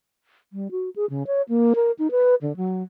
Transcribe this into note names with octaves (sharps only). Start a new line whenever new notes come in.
G3
F#4
G#4
C#3
C#5
A#3
A#4
D#4
B4
D3
F#3